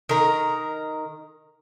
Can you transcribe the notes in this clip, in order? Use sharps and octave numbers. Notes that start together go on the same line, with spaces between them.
D#3 A#4